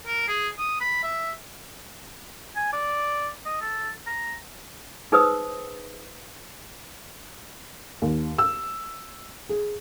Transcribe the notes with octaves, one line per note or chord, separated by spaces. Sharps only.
A#4
G#4
D#6
B5
E5
G#5
D5
D#5
A4
A#5
D#4 G#4 B4 C5 D#6 E6
D#2
E6
G#4